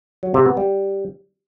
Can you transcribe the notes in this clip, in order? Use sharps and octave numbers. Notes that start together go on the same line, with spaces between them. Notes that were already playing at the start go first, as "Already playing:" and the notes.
F#3
C3
B3
G3